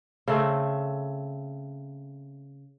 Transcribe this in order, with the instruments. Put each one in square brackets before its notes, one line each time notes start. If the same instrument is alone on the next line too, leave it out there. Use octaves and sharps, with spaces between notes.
[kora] C#3 A3 C4